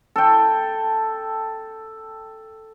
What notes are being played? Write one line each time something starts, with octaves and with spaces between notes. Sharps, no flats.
A4 G5